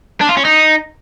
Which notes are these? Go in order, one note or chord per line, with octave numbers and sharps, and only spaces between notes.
D4
F4
C#4
D#4